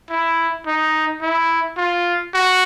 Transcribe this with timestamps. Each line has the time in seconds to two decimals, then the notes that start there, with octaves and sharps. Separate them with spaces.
0.10 E4
0.67 D#4
1.22 E4
1.77 F4
2.34 F#4